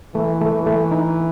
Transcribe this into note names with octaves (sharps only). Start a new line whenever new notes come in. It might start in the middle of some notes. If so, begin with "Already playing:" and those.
E3 A3
A3
E3
A3
D#4